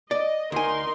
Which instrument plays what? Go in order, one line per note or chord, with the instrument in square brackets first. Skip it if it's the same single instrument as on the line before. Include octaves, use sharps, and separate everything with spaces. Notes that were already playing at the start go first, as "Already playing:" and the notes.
[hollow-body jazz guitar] D5 [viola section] D#5
[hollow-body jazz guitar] D2 G#5 [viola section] D#4 A#4 C6